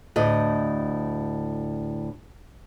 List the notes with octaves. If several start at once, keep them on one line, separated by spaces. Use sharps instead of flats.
D2 A2 D#5